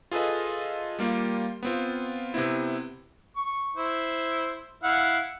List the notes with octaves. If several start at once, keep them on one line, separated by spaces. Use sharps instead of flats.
F4 G#4 A4 B4 D#5
G3 A#3 F4 G4
B3 C4 F4
C3 B3 C4 E4
C#6
E4 C5
E4 F5 F#5